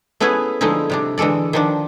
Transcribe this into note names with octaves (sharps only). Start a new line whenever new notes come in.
A3 B3 C#4 E4 G#4 B4
D3 F3 G#3 A3 D#4 E4
C3 G3 D4
D3 E3 G#3 A4 D5
D#3 F3 D4